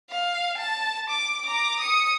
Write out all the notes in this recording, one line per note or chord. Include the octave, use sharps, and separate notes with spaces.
F5
A5
D6
A#5 D6
D#6 C#7